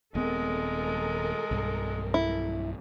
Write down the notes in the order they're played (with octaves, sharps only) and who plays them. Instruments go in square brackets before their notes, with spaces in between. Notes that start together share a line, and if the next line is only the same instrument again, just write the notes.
[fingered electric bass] D#1 B3 C4 [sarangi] G#3 [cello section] A4 A#4
[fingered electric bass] B1 G2
[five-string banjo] E4